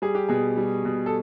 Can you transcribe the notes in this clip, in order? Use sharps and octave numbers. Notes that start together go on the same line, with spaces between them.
G3 G#4
G4
B2 G#4
G3
B2
A4